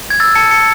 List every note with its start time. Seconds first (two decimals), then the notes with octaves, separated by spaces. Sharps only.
0.10 G#6
0.20 E6 A6
0.35 A5 C#7
0.51 A5 C#7